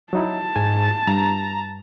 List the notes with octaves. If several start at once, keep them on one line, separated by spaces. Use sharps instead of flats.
F#3 D#4 E4 A5
G#2 G#5
G2 A#5